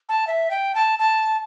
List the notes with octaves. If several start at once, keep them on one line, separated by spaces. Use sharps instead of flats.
A5
E5
G5
A5
A5